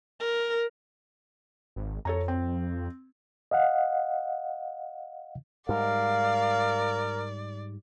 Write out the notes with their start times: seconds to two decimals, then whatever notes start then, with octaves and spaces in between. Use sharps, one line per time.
0.20 A#4
1.76 G#1
2.05 F2 A4 C#5 A#5
2.28 C4
3.51 D#5 F5 F#5
5.69 G#2 G3 A#4 D5 F5